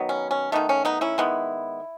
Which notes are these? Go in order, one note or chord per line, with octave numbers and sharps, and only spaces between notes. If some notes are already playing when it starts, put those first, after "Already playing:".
Already playing: D#3 F#3 B3
C#4
C#4
D#3 A3 B3 D#4
C#4
B3 D#4
C#4 E4
D#3 G#3 B3